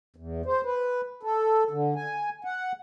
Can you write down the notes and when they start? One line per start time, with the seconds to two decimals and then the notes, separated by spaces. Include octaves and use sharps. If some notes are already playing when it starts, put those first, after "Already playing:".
0.16 E2
0.46 C5
0.65 B4
1.23 A4
1.71 D3
1.96 G#5
2.45 F#5